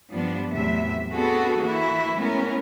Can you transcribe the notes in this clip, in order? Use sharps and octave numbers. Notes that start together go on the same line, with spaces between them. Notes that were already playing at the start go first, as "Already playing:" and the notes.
G2 F3 G3 B3 D4
E2 A2 C3 F#3 E5
B3 C4 D4 F#4 G#4 A4
E3 A#3 E4 F#4
G#3 A3 B3 C#4 E4 A#4